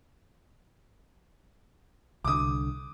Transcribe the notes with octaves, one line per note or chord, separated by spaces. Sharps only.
C2 D3 D6 D#6